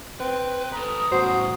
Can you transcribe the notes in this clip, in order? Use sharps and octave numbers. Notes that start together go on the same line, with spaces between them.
C4 B4
A4 B4 A#5 D#6
E2 A2 F#4 C5